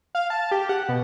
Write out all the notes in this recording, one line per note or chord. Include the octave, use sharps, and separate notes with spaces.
F5
A5
G4
F#5
B2